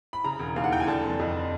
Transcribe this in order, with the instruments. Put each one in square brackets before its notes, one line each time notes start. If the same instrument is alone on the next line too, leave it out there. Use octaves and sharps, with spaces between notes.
[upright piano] B5
C#3 A#5
E1
D#2 F5
F#5
E3 G5
G#5
D3 A5
F1
F2